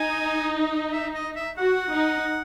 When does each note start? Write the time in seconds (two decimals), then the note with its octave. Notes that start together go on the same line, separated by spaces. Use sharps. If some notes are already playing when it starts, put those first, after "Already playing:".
Already playing: D#4 G#5
0.92 E5
1.14 D#5
1.36 E5
1.57 F#4 F#5
1.90 D#4